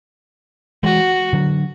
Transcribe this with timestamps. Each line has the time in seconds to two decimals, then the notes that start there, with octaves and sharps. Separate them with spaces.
0.83 E3 G#3 F#4
1.33 D3 F#3